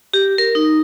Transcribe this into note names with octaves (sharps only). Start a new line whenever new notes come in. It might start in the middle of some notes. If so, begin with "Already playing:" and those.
G4
A#4
D#4